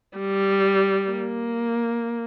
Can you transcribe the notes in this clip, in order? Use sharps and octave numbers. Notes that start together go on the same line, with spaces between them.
G3
A#3